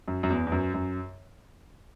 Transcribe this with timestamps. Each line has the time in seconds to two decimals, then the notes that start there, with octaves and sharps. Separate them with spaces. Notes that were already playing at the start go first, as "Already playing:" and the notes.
0.08 F#2
0.23 F#2
0.30 E2
0.47 E2
0.52 F#2
0.74 F#2